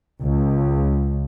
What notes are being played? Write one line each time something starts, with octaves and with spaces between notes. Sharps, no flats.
C#2